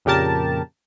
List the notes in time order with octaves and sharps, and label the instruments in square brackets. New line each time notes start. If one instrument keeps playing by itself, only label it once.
[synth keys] F2 A#2 C#3 G4 A#4 A5